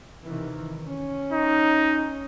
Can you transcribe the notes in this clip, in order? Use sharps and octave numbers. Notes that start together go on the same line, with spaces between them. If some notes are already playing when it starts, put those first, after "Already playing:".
C3 D#3 E3
C#4
D#4